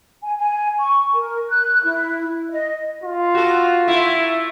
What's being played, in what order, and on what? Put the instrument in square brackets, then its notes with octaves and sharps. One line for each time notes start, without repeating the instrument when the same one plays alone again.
[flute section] G#5
G#5
C#6
A#4
F#6
E4
D#5
[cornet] F4
[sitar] F#4 A4
A3 E4